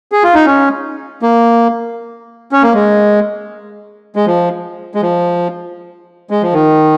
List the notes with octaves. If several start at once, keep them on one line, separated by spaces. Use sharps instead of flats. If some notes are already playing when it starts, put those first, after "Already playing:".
G#4
F4
D#4
C#4
A#3
C#4
A#3
G#3
G#3
F3
G#3
F3
G#3
F3
D#3